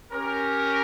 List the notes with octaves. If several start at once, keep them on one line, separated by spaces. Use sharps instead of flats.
C#4 G4 A#4